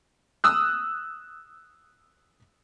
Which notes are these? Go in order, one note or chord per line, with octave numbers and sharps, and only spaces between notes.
D#6 E6 F#6